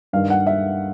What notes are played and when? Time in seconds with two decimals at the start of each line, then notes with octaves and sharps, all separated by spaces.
0.13 G2 D#3 F5
0.30 F#5
0.47 E5